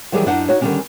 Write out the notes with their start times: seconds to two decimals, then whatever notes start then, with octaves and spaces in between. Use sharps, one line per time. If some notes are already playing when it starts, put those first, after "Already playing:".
0.12 D#3 E3 F#3 G3 G4 G#4
0.26 F#2 D4 D#4 F#5
0.49 D#4 F#4 C#5
0.61 D3 D#3 F3 G3 C#4 D4